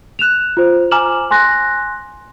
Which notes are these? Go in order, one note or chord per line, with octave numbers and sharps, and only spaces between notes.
F#6 E7 F7
F4 C5
G#5 A#5 D6 F6 E7 F#7
G#5 C6 F#6 A#6